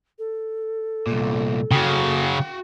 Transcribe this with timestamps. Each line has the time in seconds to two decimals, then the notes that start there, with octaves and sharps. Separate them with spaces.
0.19 A4
1.07 C2 A#2
1.72 C#3 F#3 F#4 G5